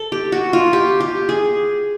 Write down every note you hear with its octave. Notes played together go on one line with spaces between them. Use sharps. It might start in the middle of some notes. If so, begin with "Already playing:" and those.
Already playing: A4
G4
F#4
F4
G4
G4
G#4